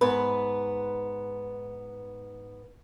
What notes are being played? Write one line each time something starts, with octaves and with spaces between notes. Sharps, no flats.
G#2 B3 B4